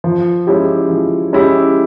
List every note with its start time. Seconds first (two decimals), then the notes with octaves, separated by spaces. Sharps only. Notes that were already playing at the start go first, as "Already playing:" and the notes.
0.04 F3
0.47 G#3 C#4 E4 G4
0.90 F3
1.33 G#3 C#4 E4 G4